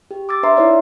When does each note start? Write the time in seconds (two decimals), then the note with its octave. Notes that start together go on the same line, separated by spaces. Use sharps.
0.11 G4
0.29 D6 E6 A6
0.43 D4 B4 E5 A#5 C6
0.56 D#4 E4 B4 C#5 D5